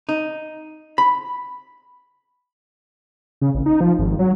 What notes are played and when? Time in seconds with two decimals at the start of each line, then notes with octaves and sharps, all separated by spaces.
0.09 D#4
0.98 B5
3.41 C#3
3.55 A1
3.66 D#4
3.81 F3
3.99 G#1
4.19 F#3